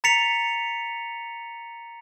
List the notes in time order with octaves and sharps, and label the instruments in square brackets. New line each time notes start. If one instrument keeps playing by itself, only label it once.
[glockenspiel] A#5 A6 B6 C#7 F7